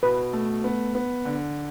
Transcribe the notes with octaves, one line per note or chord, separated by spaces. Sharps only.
B2 B4
A3
B3
B3
D3